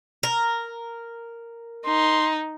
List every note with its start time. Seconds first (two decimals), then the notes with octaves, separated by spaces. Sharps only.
0.23 A#4
1.85 D#4 C6